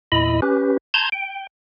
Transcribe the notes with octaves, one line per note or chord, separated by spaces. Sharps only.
E2 A#2 E4 D#5 B5
C#4 G4 B4
A5 A#5 C6 G6 G#6
G5